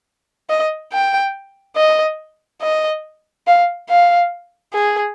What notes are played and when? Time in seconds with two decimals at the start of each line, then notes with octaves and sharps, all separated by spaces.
0.50 D#5
0.92 G5
1.76 D#5
2.62 D#5
3.47 F5
3.89 F5
4.73 G#4